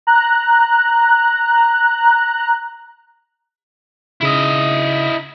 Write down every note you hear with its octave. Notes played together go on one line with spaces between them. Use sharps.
A#5 F#6
C#3 D#4 E4 D#5